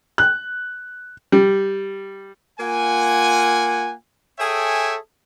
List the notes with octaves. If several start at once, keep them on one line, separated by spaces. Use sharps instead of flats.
F#6
G3
A#3 F4 F#5 G#5
G#4 A4 C#5 E5 G5 G#5